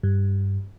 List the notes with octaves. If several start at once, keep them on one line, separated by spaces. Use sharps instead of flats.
G2